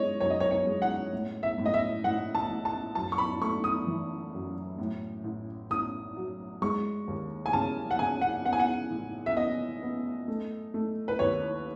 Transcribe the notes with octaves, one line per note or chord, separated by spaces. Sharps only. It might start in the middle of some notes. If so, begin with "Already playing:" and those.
Already playing: G#3 C#5 D#5
F#2 C#5
D#5
C#5
C#5
G#3
F#5
A2
E5
A2
D#5
E5
A2 F#5
A5
A1
A5
F#2 A5
C#6
B5
A3 C#6
D#6
E3
F#2
A2
A1
A1 D#6
F#3
G#3 C#6
D#2
G#5
C#3 A5
F#5
C#3 G#5
F#5
B3 F#5
G#5
F#5
A1
E5
B3 D#5
B3
A3
A3
B4
D#2 C#5